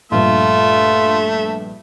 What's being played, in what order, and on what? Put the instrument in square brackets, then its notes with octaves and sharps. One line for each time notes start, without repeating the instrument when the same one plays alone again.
[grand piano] A#1 G2 [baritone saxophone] A3 [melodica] F4 [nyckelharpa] E5